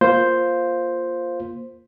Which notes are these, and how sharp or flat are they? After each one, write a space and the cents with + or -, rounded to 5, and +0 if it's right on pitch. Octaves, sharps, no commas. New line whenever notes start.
A#3 +0 F4 +0 C5 +0